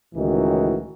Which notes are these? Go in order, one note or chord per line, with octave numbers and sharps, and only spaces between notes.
C#2 A2 D#3 E3 D#4 F#4